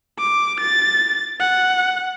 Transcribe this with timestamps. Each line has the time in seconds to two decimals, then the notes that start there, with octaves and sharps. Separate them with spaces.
0.19 D6
0.61 A6
1.40 F#5